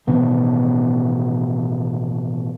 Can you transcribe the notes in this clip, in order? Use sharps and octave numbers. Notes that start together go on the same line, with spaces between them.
A1 B2 D#3 B3